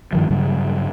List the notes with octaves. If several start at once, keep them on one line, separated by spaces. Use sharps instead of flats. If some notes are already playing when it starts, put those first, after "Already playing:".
G2 D#3 F3
G2 C#3 F#3 G3